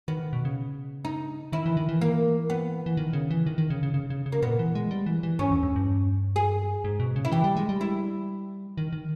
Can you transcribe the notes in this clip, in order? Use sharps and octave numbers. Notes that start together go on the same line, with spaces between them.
D#3 B3
B2
C#3
D#4
D#3 E4
E3
D#3
E3
A#3
B3
E3
D#3
C#3
E3
D#3
D#3
C#3
C#3
C#3
C#3
C#3
A#3
A#2 B3
E3
G#3
G3
E3
E3
G#2 C#4
E2
E2
G2
G#4
G#2
B2
C#3
E4
E3 G4
G3
G#3
G3
E4
D#3
D#3